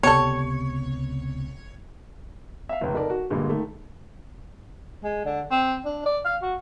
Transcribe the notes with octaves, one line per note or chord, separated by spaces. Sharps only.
C#2 C3 B3 G4 A4 C#5
E5 F5
F1 C#2
D#4 A4 A#4 D5
F#4
G2 A#2 D3 G3 G#3
D#3 A3
G#3
D3
C4
D4
D5
F5
F#4